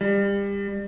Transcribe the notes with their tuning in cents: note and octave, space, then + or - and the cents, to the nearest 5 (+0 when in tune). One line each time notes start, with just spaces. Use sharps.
G3 +30